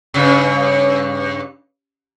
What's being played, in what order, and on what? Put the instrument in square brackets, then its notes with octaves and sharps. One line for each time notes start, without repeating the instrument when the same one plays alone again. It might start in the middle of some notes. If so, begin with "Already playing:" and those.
[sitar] G2 C#3